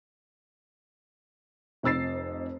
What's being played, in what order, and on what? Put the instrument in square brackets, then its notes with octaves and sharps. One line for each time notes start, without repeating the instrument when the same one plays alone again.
[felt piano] F1 F2 E6 A6 C7